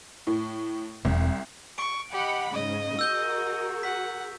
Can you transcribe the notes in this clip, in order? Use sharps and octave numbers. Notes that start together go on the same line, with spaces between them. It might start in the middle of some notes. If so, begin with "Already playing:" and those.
A2
E1 C2
C#6 D7
G4 D#5 F#5 B5
G#2 C#3 D#5
F#4 G#4 A#4 E6 G6 G7
F#5 B6